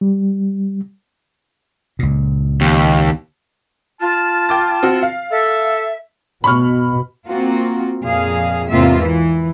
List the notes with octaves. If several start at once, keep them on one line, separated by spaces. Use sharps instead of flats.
G3
C#2 A#2
D#2
F4 A5 F6
G5 D6 A6
C4 F#4
F5
A4 E5
B2 B5 C#6 F6
A#3 C4 F4 F#4
F2 A#2 G#4 F5
E2 G#2 C3 A#3 F4 E5
E3